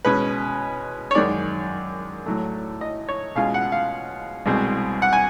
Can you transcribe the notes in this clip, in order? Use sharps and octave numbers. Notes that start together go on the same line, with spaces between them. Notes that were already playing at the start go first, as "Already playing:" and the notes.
B2 G#3 C#4 B4
C#5
F#2 D#3 G#3 D5
A2 F#3 A3
D#5
C#5
B2 G#3 C#4 F4 F5
F#5
F5
C2 B2 G#3 C4
F#5
G#5